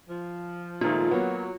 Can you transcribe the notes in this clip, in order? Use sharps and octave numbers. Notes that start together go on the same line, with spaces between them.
F3
A#2 D#3 F3 G#3 A3 F4
F#3 A#3 B3